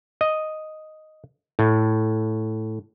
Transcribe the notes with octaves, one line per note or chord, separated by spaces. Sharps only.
D#5
A2